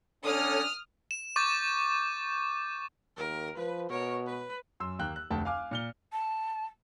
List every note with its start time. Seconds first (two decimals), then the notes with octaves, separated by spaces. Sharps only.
0.24 D3 C#4 D4 A4 C#5 D#6 F6
1.11 E7
1.36 C#6 D6 G6 A6
3.17 D#2 A#4
3.57 F3 B4
3.90 B2 A#4 C#5
4.27 B4
4.80 F#2 C6 E6
4.99 D#2 A#3 G5 F#6
5.16 F#6
5.30 F1 D2 G5 A5
5.45 F5 G#5 D6 F6
5.71 A#2 F6 G7
6.12 A5